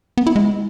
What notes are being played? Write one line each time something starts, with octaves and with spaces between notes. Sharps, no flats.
B3
E4
G#3